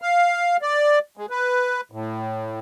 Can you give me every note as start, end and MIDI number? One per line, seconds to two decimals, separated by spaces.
0.02 0.57 77
0.62 0.99 74
1.17 1.26 56
1.30 1.81 71
1.92 2.60 45